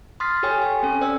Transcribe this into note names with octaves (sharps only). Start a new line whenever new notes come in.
C6 D#6 F6 A6 B6 C7
G4 A4 C#5 G5 G#5
G#5
C4 C#4 A4
C5 D5 G5 E6